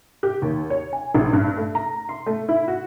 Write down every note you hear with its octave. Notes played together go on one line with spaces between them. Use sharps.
G4
D#2
C#5
G#5
A#1
G2
A3
A#5
C6
A3
E4
F#4